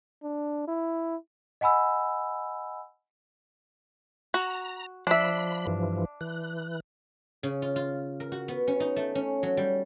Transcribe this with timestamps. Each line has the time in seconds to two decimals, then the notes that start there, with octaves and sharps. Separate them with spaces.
0.23 D4
0.68 E4
1.61 D#5 F#5 G#5 B5 E6
4.34 F#4 A#5
5.07 F3 D4 E5 B5
5.67 G2 E3 F3
6.21 E3 F#6
7.43 C#3
7.62 F4
7.76 F4
8.20 A#4
8.32 F#4
8.48 B3
8.67 C#4
8.80 D#4
8.96 A3
9.15 C#4
9.43 F#3
9.57 G3